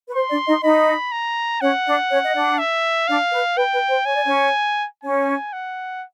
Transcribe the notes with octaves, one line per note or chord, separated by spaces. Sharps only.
B4
C5 C6
D4 D5
D#4 D#5
D#4 D#5 B5
A#5
C#4 C#5 F#5
D4 D5
C#4 C#5
D#5
D4 D5
E5
D4 D5 F5
B4
B4 G5
B4
C5
C#5 G#5
D5
C#4 C#5
C#4 C#5 G#5
F#5